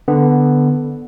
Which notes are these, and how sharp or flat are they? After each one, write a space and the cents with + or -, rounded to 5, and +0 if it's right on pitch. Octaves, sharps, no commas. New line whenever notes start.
D3 +0 B3 +0